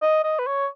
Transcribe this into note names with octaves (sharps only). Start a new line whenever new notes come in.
D#5
D#5
B4
C#5